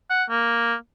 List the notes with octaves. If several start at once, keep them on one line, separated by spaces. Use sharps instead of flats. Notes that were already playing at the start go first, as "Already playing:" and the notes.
F#5
A#3